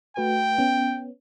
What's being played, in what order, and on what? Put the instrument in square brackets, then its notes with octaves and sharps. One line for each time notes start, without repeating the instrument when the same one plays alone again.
[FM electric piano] A3 F#4 B4 [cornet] G5
[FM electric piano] B3 C#4